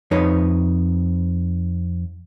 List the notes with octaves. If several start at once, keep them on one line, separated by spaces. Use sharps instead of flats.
F2 D#4 B4 C#5